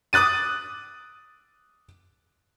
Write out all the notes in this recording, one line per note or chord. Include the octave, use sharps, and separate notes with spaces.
D6 D#6 F#6 A6 D#7